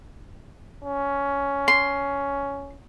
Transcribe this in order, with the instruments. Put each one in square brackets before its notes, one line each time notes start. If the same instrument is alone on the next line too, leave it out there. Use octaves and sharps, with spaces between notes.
[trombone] C#4
[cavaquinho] C6